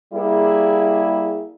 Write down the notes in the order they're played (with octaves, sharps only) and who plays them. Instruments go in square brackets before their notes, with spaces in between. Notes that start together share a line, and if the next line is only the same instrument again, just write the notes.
[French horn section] G3 A#3 E4 G#4